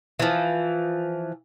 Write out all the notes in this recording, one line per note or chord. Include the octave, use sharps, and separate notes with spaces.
E3 F3